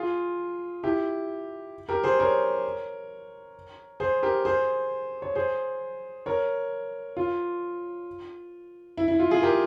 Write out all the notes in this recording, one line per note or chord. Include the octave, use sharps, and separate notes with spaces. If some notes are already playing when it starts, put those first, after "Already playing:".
Already playing: F4 G#4
E4 G4
G4 A#4
G#4 C5
A#4 C#5
G#4 C5
G4 A#4
G#4 C5
C#5
G#4 C5
A#4 C#5
F4
E4
E4
F4
F4 G#4
G4 A#4